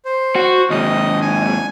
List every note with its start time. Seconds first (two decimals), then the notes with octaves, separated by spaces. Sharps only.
0.05 C5
0.36 F#4
0.70 D#2 G#2 D#5
1.21 G#5